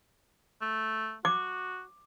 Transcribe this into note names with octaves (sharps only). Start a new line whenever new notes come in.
A3
F#4 D6